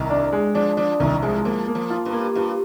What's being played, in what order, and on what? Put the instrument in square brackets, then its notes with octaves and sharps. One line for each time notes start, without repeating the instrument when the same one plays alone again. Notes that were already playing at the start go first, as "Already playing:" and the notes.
Already playing: [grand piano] C2 [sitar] D#3
[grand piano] D4
G#3
[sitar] F3 [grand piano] D4
[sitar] F3 [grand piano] D4
[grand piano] C2 [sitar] D#3
[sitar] F3 [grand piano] G#3
[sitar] F3 [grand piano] A#3
[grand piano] A#3
[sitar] F3
[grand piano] F4
[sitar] G2
[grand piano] A#3
[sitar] G2 [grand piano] F4